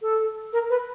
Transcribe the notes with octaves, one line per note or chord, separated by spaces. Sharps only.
A4
A#4
B4